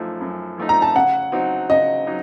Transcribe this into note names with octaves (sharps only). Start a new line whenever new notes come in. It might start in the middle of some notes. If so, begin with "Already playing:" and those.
Already playing: F#2 F3 A3 D#4
F#2
F3 A3 D#4
A#5
A5
C#3 F#5
F#3 C4 D#4
C#3 D#5
F#3 D#4